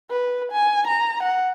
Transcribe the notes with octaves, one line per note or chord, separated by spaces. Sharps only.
B4
G#5
A#5
F#5